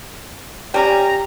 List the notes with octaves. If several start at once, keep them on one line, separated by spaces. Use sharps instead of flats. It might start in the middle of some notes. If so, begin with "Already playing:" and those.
G3 C#4 G4 A#5